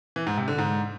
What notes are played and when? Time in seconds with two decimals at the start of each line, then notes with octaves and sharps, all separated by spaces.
0.16 E3
0.27 G#2
0.37 C3
0.48 D3
0.58 G#2